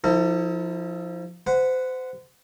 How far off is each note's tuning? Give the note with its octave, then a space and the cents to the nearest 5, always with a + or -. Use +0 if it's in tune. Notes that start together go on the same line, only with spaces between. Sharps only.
F3 +0 E4 -45 A4 +45
C5 -30 F#5 +0 B5 +0